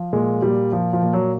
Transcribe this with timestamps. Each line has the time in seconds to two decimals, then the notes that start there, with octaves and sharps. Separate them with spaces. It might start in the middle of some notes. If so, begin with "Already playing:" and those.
Already playing: F3
0.13 A#2 G#3
0.42 A#2 G3
0.73 F3
0.93 F3
1.03 A#2
1.13 F#3